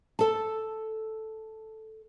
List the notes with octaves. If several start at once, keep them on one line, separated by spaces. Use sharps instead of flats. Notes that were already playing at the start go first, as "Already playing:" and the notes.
A4 A5